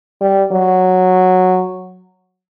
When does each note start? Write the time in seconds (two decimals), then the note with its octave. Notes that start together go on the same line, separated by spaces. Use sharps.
0.21 G3
0.52 F#3